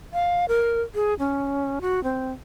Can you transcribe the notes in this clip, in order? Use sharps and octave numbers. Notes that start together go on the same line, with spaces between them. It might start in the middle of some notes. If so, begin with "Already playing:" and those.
F5
A#4
G#4
C#4
F#4
C4